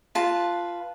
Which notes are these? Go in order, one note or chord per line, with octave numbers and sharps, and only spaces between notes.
F4 B4 A5